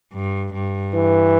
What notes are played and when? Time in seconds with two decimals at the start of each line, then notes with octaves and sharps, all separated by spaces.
0.13 G2
0.54 G2
0.94 E3